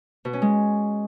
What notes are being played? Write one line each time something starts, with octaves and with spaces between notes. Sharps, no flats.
B2
C#4
G#3